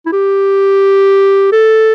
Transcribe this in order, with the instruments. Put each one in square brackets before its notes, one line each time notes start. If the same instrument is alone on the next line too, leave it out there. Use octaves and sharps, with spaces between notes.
[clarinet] E4
G4
A4